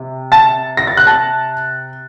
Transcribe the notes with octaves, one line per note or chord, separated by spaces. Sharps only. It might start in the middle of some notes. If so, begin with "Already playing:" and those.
Already playing: C3
A5 A6
A#6
A6
F#6
A5 A6